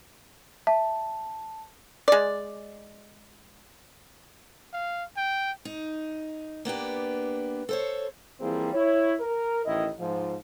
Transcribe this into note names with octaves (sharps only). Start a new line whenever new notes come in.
E5 A5
G#3 D5
F5
G5
D#4
A#3 B3 D4 G4
A4 C5 C#5
E3 F3 G3 A#3 C4 G#4
E4 C#5
A#4
A1 D#3 E4 D#5
G#2 F3